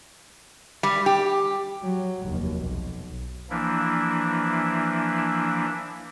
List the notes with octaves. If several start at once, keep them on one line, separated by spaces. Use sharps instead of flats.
G3
G4
F#3
F1 D#2
B1
E3 F3 A#3 D4 E4